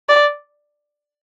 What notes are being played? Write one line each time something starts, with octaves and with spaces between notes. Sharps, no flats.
D5